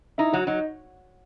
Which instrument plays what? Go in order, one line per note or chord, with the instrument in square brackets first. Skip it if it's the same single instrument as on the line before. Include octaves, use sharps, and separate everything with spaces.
[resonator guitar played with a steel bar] D#4 [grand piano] E4
[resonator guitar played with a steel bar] F#3 [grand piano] F#4
[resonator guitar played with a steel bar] F#3 [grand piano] D#4